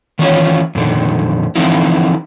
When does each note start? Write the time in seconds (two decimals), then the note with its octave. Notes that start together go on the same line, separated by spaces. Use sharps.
0.19 D#3 E3 C#4 F4 C#5
0.75 F2 A#2 D3 D#3
1.56 D3 E3 F3 C4 D#4 E4